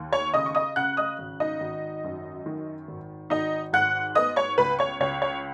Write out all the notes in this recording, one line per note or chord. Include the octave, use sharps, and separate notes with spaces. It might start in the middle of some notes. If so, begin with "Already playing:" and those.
Already playing: D#2
C#5 C#6
C#3 D#5 D#6
C#6
D#5 D#6
C#3 F#5 F#6
D#5 D#6
G#1
D#4 D#5
G#1
F#2
D#3
G#1
G#1 D#4 D#5
G#2 F#5 F#6
B3 D#5 D#6
C#5 C#6
C#2 B4 B5
C#5 C#6
C#2 C#5
C#5